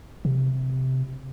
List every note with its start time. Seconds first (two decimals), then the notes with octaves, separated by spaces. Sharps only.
0.25 C3